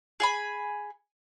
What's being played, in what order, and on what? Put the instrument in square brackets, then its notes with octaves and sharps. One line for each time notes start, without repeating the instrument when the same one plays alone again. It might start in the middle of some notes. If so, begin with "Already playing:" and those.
[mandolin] G#4 G#5 B5